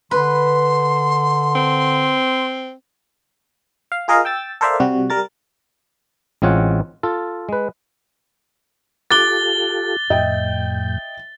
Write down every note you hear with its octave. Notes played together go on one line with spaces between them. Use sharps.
D3 B4 C6
C4
F5
F4 G#4 A#4 D#5 F5
G5 E6 A6
A4 A#4 C5 D5 E5 F5
C3 G3 F#4
G3 A#4 A6
A1 G#3 C4 F4 C#5 F#5
F4 A4
G#3 B4
F4 G4 A4 D6 F#6 A6 G7
F2 A2 D#5 E5 G5 G6